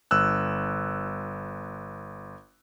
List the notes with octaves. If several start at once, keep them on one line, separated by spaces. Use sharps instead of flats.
G1 E6 F#6